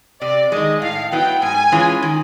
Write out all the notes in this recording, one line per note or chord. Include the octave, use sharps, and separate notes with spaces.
C3 D5
D#3 G#3 D#5
A2 F5
F#3 B3 E4 G5
G#2 G#5
E3 G#3 C#4 F4
D#3